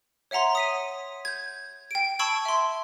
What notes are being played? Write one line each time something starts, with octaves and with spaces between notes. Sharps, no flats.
C#5 E5 F#5 A#5 C6
D#6 B6 D#7
G6 G#6
G5 D7
A5 B5 C#6 E6 G#6 D7
E5 C6